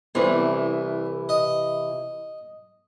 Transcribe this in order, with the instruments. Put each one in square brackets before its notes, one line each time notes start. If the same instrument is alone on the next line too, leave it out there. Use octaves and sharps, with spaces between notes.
[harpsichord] C2 [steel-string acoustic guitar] C3 E3
[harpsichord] D#5